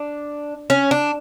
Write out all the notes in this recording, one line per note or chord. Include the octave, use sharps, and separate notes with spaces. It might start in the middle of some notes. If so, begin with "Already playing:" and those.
Already playing: D4
C#4
D4